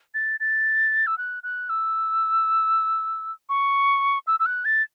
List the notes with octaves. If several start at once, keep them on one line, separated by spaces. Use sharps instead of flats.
A6
A6
E6
F#6
F#6
E6
C#6
E6
E6
F#6
A6